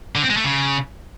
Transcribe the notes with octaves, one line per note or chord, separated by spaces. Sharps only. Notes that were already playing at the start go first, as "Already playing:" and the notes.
D3
C4
G#3
A3
C#3